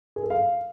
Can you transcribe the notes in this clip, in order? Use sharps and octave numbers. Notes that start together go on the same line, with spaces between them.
G#4
A4
F5